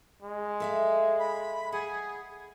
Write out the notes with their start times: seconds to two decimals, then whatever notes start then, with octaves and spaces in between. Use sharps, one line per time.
0.22 G#3
0.60 A4 E5 F5
1.19 B5
1.72 G#4 F#5